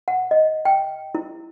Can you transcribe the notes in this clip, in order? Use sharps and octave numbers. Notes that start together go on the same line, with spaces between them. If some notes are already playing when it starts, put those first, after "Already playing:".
F#5
D#5
G5
E4